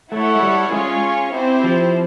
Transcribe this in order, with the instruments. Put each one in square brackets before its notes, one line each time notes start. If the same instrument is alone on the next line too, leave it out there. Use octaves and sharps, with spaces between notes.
[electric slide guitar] A3 [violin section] E4 A4 C#5 F#5
[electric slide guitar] G#3
G3
[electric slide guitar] G#3 [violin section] C#4 F4 G#4 C#5
[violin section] C4 E4 G4 C5
[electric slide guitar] F3